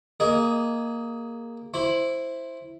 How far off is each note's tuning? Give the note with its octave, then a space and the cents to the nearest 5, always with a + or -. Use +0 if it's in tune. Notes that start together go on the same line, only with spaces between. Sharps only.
A#3 +0 G#4 +15 D#5 +0
E4 +0 C5 +5 B5 +0